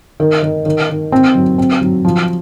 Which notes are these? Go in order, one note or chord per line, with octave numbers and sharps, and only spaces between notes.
D#3
D#3
D#3
D#3
C4
F#3
C4
F#3
F3